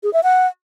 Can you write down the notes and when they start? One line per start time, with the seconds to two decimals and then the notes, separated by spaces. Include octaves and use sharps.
0.03 G#4
0.13 E5
0.23 F#5